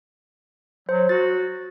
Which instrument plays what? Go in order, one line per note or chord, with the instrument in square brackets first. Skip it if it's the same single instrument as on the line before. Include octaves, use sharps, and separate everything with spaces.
[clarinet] F#3 [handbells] C5
[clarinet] F#4 [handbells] A6